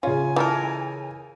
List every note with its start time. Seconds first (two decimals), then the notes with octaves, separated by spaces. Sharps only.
0.03 C#3 C#4 F4 G#5
0.36 E3 D#4 A4 A#4